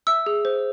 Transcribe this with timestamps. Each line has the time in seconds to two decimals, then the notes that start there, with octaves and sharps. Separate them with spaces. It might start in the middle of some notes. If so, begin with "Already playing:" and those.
0.07 E5 E6
0.26 G#4
0.45 C5